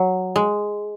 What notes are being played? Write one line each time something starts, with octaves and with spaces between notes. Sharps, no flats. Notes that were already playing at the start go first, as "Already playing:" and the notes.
Already playing: F#3
G#3